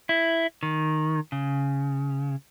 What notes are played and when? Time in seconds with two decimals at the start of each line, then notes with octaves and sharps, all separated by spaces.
0.09 E4
0.63 D#3
1.32 C#3